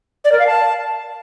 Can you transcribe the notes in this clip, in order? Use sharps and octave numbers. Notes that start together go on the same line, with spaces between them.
D5
A#4
F5
A5